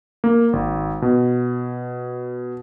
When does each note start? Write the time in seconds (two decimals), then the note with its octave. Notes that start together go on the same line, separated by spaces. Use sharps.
0.24 A#3
0.53 G#1
1.02 B2